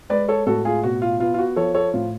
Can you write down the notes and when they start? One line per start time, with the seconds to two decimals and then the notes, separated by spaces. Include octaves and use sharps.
0.10 G#3 B4 D5
0.28 A4 C#5
0.47 A2 F#4 A4
0.65 F4 G#4
0.83 B2 F#4
1.02 F4
1.20 B3 F4
1.34 F4
1.39 F#4
1.56 F3 A4 C#5
1.75 A4 C#5
1.93 A2 F4